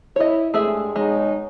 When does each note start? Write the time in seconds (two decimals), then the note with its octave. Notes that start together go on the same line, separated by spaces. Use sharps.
0.16 E4 C#5 D#5
0.54 G2 G#3 A3 G#4 E5
0.96 B2 G#3 D#4 C#5